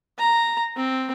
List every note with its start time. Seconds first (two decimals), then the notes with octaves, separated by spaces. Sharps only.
0.19 A#5
0.77 C4